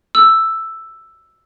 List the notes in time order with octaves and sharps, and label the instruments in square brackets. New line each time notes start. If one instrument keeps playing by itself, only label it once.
[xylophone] E6